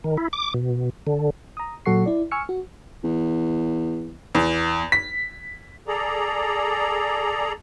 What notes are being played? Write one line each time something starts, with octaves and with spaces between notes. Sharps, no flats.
D#3
E4
D6
B2
D3
A#5 D#6
A#2 F#3 A4 F#5 C#6 C7
E4 D5
G#5 C#6 E6 F6 C#7
F#4
E2
E2
B6
G#4 A4 D5 A#5